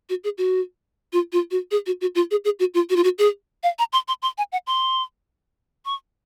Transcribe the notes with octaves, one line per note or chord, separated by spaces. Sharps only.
F#4
G#4
F#4
F4
F4
F#4
G#4
F#4
F#4
F4
G#4
G#4
F#4
F4
F#4
F4
F#4
G#4
F5
A#5
C6
C6
C6
G#5
F#5
C6
C#6